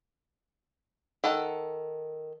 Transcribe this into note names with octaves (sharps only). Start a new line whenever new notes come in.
D#3 A4 F#5